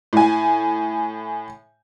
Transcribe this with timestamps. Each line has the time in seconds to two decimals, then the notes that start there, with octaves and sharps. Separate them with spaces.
0.13 A2 G#5